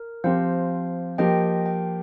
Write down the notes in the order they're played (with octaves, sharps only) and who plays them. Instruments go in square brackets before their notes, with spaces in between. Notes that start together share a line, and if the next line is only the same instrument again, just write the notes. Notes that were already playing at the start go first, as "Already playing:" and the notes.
Already playing: [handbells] A#4
[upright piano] F3 C4 G4 [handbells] C5 F5
[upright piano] F3 A#3 G4 [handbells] D#5 G5
[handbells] G5